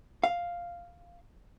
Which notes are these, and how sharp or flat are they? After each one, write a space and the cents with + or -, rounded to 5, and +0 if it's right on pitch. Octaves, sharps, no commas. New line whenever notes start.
F5 +0